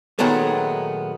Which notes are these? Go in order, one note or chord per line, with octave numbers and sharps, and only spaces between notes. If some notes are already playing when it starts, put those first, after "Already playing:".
A#2 D#3 F#3 G#3 A3 B3